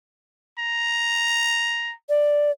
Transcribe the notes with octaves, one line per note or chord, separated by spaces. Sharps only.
A#5
D5